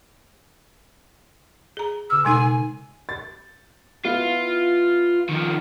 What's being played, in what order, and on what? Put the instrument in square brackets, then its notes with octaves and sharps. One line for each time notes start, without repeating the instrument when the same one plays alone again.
[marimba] G#4 A#5
[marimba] C#3 F6 [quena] E6
[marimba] B2 G#3 D#4 [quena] G#5
[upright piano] A6
[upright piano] B3 E4 [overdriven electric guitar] F4
[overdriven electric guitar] D#3 F3